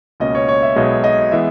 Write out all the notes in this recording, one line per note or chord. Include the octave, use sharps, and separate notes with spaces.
C#2 B2 A#3 C#4 D#5
C#5
C#5
E5
B1 B2 G#3 D#5
D#5
E3 G#3 B3 E5